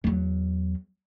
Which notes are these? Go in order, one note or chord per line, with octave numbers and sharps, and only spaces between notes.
E2 F#3